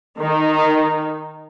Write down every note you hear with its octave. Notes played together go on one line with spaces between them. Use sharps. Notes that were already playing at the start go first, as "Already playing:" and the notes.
D#3 D#4